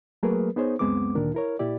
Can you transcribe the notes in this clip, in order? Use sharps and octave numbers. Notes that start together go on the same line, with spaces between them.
F#3 A3 A#3 G#4 A#4 B4
B3 D#4 G#4 C5 C#5
C#2 F#2 G#3 B3 C4 D6
D2 A#2 D#3 D4 A#4
E4 A#4 C#5
A#2 E4 G4 D5